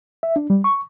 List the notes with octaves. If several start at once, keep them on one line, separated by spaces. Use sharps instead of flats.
E5
D4
G3
C#6